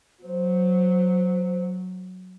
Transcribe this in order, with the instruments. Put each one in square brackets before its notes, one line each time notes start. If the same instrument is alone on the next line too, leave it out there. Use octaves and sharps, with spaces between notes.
[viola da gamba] F#3 [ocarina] C5